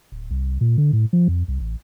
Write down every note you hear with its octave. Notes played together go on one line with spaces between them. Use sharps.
D1
C2
A#2
D3
A2
F3
F2
C2
A1